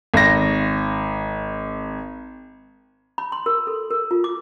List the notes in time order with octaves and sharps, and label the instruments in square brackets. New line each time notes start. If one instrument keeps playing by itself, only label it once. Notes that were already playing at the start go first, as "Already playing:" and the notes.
[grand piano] G#1 A#6
[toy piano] B5
C6
A#4
A4
A#4
F4
D6